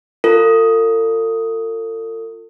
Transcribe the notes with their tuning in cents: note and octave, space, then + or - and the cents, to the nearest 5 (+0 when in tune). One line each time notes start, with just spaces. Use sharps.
F4 +0 A4 +40